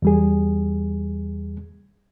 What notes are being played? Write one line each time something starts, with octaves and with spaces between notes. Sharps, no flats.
E2 G3 G#4